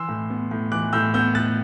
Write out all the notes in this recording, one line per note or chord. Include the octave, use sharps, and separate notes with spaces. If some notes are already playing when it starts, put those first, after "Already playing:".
Already playing: E3 C6 E6
A2
B3
A2
E3 D6 F#6
A2 E6 G6
B3 E6 G6
A2 F#6 A6